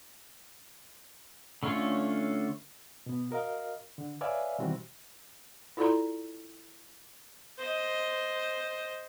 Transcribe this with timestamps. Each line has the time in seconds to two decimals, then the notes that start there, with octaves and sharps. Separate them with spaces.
1.63 D3 A3 C#4 F4 C#5
3.06 B2 B3
3.31 F#4 A#4 D#5 F5
3.98 D3
4.21 B4 C#5 D5 E5 F5 G#5
4.58 B2 D#3 E3 G3 C4 F#4
5.77 E4 F4 A4 D5 A#5 C6
7.58 C5 D#5